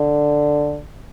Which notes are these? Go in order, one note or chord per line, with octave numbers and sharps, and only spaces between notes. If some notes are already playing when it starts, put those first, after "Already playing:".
Already playing: D3